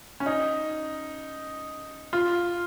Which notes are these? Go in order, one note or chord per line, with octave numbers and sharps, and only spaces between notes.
C#4
D#4
F4